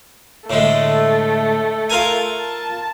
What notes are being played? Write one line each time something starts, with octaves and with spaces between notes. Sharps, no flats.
A2 D3 G#3 A3
F4 A#4 G#5
A5